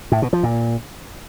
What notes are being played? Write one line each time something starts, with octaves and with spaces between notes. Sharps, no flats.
A2
B2
F3
A#2